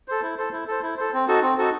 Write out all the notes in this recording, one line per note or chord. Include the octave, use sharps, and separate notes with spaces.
A4 C5
E4
A4 C5
E4
A4 C5
E4
A4 C5
C4
D#4 F#4 A4
C4
D#4 F#4 A4